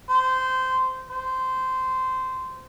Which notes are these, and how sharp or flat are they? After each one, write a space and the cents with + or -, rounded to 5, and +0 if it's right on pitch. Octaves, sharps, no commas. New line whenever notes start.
C5 -15
C5 -15